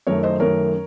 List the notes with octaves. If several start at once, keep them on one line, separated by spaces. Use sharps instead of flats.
F#2 D#3 A3 A#4 C#5
C5 D#5
F#2 D#3 A3 A#4 C#5